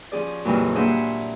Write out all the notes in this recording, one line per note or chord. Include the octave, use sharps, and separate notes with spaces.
F3 C#4 G#4 D5
F2 A#2 C#3 E3 F#3 G3
A#3 D4 G#4 C5 E5 F#5